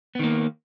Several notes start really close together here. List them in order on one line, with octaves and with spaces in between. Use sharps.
B3 D#3 A#3